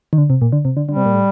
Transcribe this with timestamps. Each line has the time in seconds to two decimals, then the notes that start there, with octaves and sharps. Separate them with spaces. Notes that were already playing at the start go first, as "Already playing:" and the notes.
0.13 D#3
0.18 D3
0.30 C3
0.41 A#2
0.52 D3
0.65 C3
0.77 D3
0.88 D3 G3
0.97 C3
1.06 A#2
1.14 A2